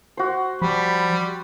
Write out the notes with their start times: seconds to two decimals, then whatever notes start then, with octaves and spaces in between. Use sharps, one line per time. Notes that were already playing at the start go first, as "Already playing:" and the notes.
0.17 F#4 C5
0.62 F3 G3 B5